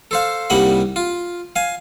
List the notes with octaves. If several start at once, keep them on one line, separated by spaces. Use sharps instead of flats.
A4 C5 F5
C2 G3 A#3 D#4 F#5 B5
F4
F5 G#5